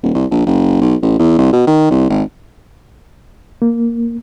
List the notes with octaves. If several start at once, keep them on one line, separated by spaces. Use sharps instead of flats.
D#1
C2
A#1
F#1
B1
A1
E2
C2
B2
D#3
C2
G#1
A#3